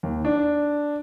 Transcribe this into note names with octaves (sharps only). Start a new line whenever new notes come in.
D#2
D4